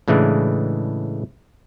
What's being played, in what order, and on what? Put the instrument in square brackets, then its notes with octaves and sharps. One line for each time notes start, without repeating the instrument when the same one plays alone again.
[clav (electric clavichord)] A2 C#3 E3 G#3 D4